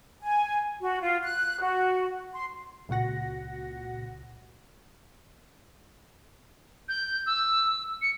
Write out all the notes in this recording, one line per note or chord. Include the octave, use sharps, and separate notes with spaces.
G#5
F#4
F4
F#6
F#4
C6
C#2 A#2 F#4 F#5 A#6
G6
E6
C#7